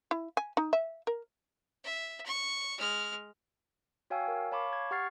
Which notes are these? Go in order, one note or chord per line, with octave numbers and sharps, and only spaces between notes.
E4
G#5
D#4
E5
A#4
E5
C#6
G#3 F6
F#4 C#5 F5 G5 G#5 E6
A#4
C#5 F5 A5 B5 C#6 D6
G#6
G4 F#5 C#6 F6 A6 C7